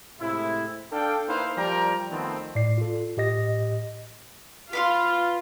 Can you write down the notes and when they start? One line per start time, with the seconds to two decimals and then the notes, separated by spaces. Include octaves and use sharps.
0.20 A2 C3 G#3 E4
0.92 D4 A4 D5 F5 G5
1.28 A#3 D#4 E4 B4 C5 F5
1.57 F3 G3 A#4 D5 G5 A#5
2.11 D#3 F3 A3 B3 C4
2.55 A2 D5 C7
2.78 F4 A4
3.17 A2 G4 D#5 A#6
4.73 F4 B4 F5 C6